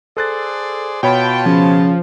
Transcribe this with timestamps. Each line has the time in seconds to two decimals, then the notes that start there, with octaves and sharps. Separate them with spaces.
0.17 G#4 A4 C5 D5 F#6 A6
1.03 B2 F4 C#5 G5 A5 B5
1.46 C#3 F3